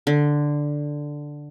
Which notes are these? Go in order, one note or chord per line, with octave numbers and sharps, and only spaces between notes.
D3